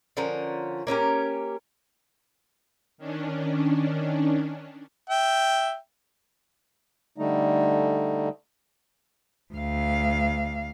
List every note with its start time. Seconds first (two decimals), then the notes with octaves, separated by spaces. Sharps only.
0.17 D3 F3 C#4 A#4
0.87 A#3 C#4 G4 A#4
2.98 D#3 C#4 D4
5.10 E5 G5
7.18 D3 G3 A3 D#4
9.54 D2 F5